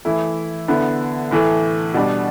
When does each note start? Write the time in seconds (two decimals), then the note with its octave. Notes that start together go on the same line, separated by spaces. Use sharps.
0.05 E3 A3 E4
0.68 D3 B3 E4
1.31 A2 E3 A3
1.94 B2 G3 D4